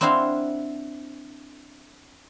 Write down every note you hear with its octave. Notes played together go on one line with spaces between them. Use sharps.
C4 D4 E4 F#4 C5 F5